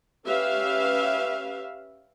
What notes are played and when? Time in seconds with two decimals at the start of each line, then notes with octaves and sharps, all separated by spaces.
0.25 C#4 G4 B4 E5 F5